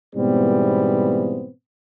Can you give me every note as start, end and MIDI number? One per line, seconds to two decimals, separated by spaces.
0.15 1.49 44
0.15 1.49 47
0.15 1.49 52
0.15 1.49 55
0.15 1.49 59
0.15 1.49 60